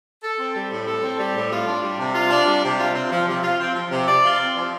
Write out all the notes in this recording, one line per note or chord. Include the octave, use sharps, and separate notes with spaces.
A4
C4
G3
A2
A4
C4
G3
A2
F4
D4
G3
C3
F4
D4
G3
C3
F4
C4
F3
C3
F4
C4
F3
C3
D5
F4
C4
F3